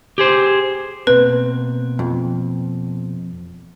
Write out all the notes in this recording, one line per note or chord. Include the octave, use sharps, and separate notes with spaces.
G4 G#4 C5
B2 A#3 C4 B4
F2